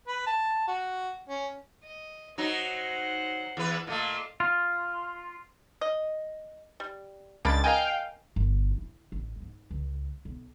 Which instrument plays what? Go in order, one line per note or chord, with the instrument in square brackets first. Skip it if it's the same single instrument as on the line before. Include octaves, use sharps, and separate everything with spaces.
[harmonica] B4
A5
F#4
C#4
[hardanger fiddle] D#5
[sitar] F#3 D#4 [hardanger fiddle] C5 F#5
[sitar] E2 B4
[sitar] A#2 A3 [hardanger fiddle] D#5 F5
[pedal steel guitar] F4
[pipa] D#5
G3
[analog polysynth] C#2 A6 [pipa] A#3 D4 B5
[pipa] A#4 D#5 G#5 [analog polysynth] F5 G5
[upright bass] G1
E4
A1
G#2
C#2
B1